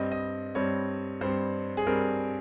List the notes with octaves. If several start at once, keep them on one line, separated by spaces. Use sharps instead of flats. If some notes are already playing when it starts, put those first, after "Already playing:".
Already playing: G2 G3 C4 D#5
D#5
G2 G3 C4 C#5
G2 G3 C4 C5
G#4
G2 G3 C4 A#4